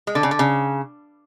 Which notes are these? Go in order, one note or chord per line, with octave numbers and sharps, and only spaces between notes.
G#3
D3
C#3
D3
C#3